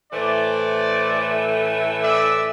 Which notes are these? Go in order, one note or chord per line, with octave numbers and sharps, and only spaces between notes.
A2 E3 A3 C5 D5
D5 E5